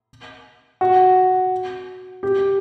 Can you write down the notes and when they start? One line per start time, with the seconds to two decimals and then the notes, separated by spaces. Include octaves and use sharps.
0.81 F#4
2.23 G4